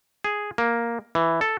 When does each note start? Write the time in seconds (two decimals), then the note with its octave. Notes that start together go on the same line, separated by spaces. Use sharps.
0.24 G#4
0.58 A#3
1.15 E3
1.41 A4